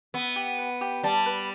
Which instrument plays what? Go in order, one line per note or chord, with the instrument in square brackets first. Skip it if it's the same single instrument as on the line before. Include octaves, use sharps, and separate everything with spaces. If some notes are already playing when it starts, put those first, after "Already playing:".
[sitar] B3 [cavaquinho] E5
[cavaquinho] G4
B4
G4
[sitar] G3 [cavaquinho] A5
[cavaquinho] B4